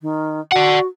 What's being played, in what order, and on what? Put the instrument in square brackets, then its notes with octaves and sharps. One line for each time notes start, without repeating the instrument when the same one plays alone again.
[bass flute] D#3
[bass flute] F#4 [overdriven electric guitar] D5 F#5